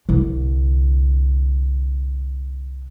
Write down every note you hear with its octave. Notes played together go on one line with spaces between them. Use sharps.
C2 D3